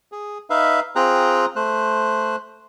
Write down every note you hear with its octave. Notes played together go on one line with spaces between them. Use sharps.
G#4
D#4 B4 E5 F5
C4 F4 G#4 G5 A#5 F#6
A3 C5 F#6